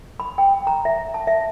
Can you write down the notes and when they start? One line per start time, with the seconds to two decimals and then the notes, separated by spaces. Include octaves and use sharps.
0.20 B5
0.38 G5
0.67 A#5
0.85 E5
1.14 A5
1.27 E5